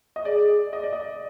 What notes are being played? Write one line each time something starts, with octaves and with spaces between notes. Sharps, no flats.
D#5
G#4 D5
D#5
D5
D#5